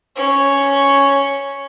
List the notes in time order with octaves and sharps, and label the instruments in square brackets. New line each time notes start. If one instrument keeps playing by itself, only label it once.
[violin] C#4 C#6